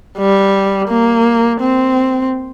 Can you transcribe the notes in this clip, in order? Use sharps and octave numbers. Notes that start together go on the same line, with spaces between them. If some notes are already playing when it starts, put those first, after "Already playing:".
G3
A#3
C4